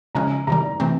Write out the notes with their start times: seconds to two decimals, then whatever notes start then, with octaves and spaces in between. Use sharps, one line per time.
0.15 C#3 F3 G#3 C#4 A#5
0.47 C3 D#3 G3 A#5
0.80 C3 E3 A3 C4